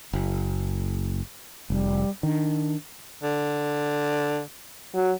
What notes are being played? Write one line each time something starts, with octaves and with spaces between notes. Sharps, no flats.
F#1
F1 G3
D#3 D4
D3
F#3